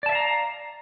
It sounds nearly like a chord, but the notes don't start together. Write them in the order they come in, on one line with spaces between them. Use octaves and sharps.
D5 A5 E5 F5 A#5